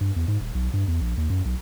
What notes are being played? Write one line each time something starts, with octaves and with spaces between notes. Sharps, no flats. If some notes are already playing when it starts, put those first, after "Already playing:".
G2
E2
G#2
D#1
B1
G2
E2
A#1
D#2
F#2
B1